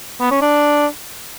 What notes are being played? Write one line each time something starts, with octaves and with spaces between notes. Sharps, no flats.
B3
C#4
D4